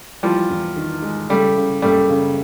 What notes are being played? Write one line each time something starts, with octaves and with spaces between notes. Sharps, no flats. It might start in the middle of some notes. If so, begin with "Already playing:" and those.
E3 F3 G3
E2
D#3
G#3
C#3 G3 A3
C#3
F#1 G3 A3
C#3